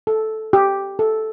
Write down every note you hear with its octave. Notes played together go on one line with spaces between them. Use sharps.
A4
G4
A4